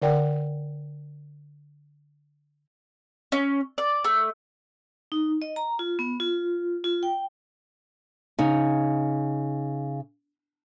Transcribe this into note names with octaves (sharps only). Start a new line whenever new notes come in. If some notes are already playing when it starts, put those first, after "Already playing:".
D3 A#4 D5 F#5 G5
C#4
D5
A3
D#4
D#5
A#5
F4
B3
F4
F4
G5
C#3 D#4